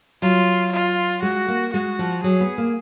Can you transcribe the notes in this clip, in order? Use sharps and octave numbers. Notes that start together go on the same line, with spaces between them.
F#3 F4
F4
G#3 F#4
A#3
G#3 F#4
F3
F#3 G#4
B3
A#3